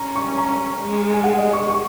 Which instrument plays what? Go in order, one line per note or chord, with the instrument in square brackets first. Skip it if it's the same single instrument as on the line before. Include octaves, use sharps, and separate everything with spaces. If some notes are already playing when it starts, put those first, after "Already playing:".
Already playing: [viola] C#4 [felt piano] A#5
[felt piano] C#6
A#5
[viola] G#3
[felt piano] G#5
F#5
D#5
C#6
C#6